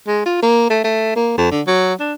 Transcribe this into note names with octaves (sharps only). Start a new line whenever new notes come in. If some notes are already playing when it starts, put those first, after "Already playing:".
G#3
F4
A#3
A3
A3
A#3
F2
D3
F#3
D4